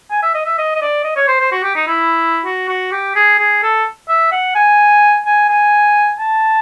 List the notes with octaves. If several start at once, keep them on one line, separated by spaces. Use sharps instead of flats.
G#5
E5
D#5
E5
D#5
D#5
D5
D#5
C#5
C5
C5
F#4
G4
D#4
E4
F#4
F#4
G4
G#4
G#4
A4
E5
F#5
G#5
G#5
G#5
A5